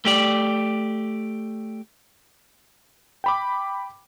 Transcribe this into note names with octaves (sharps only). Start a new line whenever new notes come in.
A3 G4 D5
G5 B5 D6